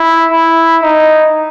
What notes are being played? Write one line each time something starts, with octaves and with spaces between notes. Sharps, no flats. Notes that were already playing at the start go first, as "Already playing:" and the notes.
Already playing: E4
E4
D#4